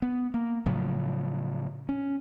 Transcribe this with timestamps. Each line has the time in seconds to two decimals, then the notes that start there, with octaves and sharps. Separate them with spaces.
0.02 B3
0.34 A#3
0.66 A2 C#3 F3 F#3
1.89 C#4